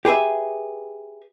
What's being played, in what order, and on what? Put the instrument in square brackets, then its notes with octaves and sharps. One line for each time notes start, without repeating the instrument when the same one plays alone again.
[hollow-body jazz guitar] G4 G#4 B4 E5